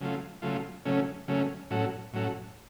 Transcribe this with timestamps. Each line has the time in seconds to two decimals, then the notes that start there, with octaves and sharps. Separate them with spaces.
0.01 C#3 F#3 A3 F4
0.42 C#3 F#3 A3 F4
0.85 C#3 F#3 A3 C#4
1.28 C#3 F#3 A3 C#4
1.71 A2 F#3 C#4 F#4 A4
2.13 A2 F#3 C#4 F#4 A4